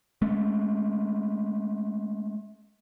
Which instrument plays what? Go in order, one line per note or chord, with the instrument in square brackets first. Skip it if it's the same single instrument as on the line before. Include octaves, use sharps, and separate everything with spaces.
[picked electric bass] G#3 A3 C#4